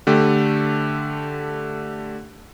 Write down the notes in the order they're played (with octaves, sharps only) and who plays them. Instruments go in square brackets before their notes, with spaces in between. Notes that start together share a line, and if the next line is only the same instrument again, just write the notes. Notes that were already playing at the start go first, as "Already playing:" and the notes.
[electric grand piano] D3 A3 G4